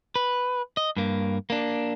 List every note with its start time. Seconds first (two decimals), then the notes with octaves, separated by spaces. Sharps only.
0.16 B4
0.77 D#5
0.97 G2 A#3
1.50 A#3 D4